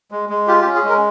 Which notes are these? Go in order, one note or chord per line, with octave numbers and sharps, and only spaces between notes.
G#3
G#3
F4 G4
G4
C#4
G#4
G#3 A#4